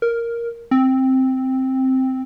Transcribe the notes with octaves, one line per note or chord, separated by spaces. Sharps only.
A#4
C4